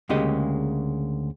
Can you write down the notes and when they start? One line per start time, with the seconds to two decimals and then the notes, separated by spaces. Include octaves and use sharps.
0.09 D2 C#3 G#3 A#3 G4 D#5